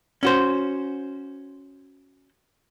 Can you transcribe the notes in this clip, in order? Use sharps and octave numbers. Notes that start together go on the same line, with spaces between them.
C#4 F#4 C5